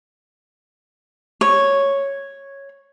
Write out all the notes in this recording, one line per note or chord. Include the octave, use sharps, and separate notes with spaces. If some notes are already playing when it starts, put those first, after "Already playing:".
C#5